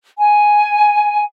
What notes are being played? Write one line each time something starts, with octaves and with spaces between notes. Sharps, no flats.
G#5